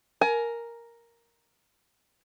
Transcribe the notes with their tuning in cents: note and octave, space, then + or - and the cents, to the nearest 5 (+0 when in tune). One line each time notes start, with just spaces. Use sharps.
A#4 +0 G#5 +20